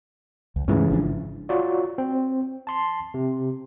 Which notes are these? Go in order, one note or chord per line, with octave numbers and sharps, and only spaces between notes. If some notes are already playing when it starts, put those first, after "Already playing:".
C#2
G2 C#3 E3 G#3 A3 C#4
G#1 F3 D4
F4 F#4 C#5 D5
C4
A5 C6 C7
C3